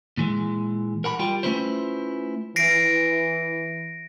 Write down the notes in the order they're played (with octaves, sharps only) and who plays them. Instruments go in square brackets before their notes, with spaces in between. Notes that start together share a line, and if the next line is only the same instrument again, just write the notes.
[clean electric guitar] A#2 E3 G#3
A#4 F#5 A#5 B5
G3 F4 G5
A3 C#4 E4 F4 B4 C5
[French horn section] E3 [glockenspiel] A#6 C7 D7